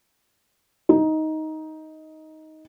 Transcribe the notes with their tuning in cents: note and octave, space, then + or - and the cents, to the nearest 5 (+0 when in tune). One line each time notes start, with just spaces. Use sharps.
D#4 +10